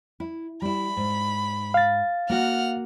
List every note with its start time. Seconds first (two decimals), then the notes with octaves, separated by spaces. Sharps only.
0.20 E4
0.62 G3 E4 B5
0.97 G#2
1.74 F5 A6
2.30 A#3 F#4 A#4 F#5 F6